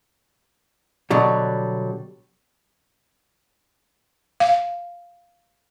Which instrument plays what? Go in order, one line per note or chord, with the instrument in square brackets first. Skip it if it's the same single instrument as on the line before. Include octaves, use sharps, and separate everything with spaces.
[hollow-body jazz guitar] B2 D3 F#3 G3
[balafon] F5